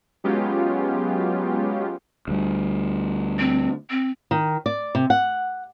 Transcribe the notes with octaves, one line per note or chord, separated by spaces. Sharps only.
F#3 G#3 B3 C#4 F4 G4
D2 G3
C4
C4
D#3
D5
C3
F#5